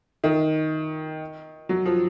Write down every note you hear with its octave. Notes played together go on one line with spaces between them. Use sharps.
D#3
F#3
F3